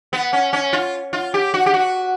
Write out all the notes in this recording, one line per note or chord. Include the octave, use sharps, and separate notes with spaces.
B3
C#4
C#4
F4
F4
G4
F#4
G4
F#4